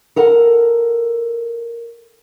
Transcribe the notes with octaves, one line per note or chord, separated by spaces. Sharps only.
A4 A#4 F#5